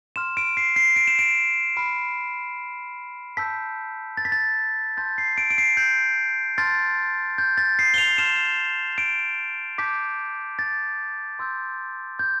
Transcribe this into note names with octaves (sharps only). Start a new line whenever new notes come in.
C6 F6 E7
D7
C7
C7
D7
E7
D7
B5 F6
A5 E6 G6 B6
A6
B6
A6
A5 C6 G6 A6
C7
D7
D7
C7
G6
A5 C6 F6 A6
G6
A6
C7
G7
F7
A5 C6 F6 E7
D7
A5 D6 G6 B6
A6
C6 E6 G6
G6